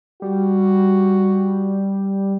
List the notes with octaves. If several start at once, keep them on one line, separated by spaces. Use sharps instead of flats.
G3 F#4